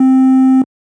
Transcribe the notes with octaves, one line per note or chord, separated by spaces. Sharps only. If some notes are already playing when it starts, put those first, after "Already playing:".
Already playing: C4